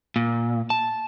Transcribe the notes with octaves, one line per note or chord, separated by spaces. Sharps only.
A#2
A5